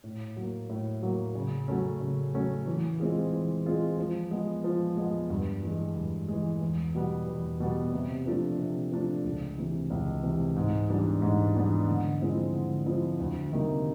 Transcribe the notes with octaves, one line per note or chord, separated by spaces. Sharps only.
A2
F#3 A#3
A2
F#3 A#3
C#3
F#3 A3 C#4
C#3
F#3 A3 C#4
E3
G#3 C4 F4 G#4
E3
G#3 C4 F4 G#4
F3
G#3 B3
F3
G#3 B3
G2
E3 G#3
G2
E3 G#3
E2
B2 G3 B3
E2
B2 G3 B3
C3
F3 A3 D4
C3
F3 A3 D4
C#2
C3 E3
C#2
C3 E3
G#2
E3 G3 B3 D4
G#2
E3 G3 B3 D4
D3
F3 G#3 C4 E4
D3
F3 G#3 C4 E4
D2
C3 D#3 G3 A#3